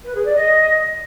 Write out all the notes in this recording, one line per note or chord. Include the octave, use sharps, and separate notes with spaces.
B4
G#4
D5
D#5